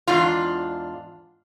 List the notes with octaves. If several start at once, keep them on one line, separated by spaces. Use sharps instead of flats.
E2 G#2 D4 F4